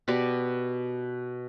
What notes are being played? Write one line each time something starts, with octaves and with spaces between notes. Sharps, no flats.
B2 G4 D5